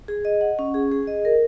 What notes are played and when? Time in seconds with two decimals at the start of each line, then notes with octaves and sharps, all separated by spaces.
0.08 G#4
0.25 D#5
0.41 F#5
0.59 C#4
0.74 G#4
0.92 G#4
1.07 D#5
1.25 A#4